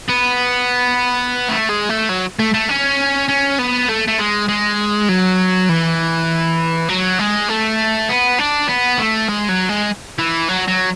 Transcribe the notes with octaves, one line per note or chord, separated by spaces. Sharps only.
B3
A3
G#3
A3
F#3
A3
A3
C#4
C#4
B3
A3
A3
G#3
G#3
F#3
E3
F#3
G#3
A3
B3
D4
B3
A3
G#3
F#3
G#3
E3
F#3
F#3